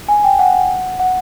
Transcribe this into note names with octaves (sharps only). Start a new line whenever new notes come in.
G#5
G5
F#5
F#5
F#5